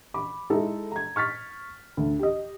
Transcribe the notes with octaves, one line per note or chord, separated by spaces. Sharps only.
B5 D6
G#3 D#4 E4 A4
A#5 G#6
C#6 F6 A6 B6
D2
G4 D#5